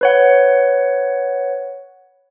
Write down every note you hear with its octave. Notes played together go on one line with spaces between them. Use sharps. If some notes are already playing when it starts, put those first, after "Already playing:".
B4 C#5 F#5